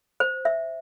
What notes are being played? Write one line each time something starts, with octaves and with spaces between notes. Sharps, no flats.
C5
E5